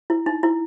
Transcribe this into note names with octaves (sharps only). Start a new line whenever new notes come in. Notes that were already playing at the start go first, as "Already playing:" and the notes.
E4
D#4
E4